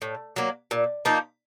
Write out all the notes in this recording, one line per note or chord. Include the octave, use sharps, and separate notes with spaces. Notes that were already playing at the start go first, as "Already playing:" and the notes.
A2
F#3 A#3
A#2
F3 A#3 D#4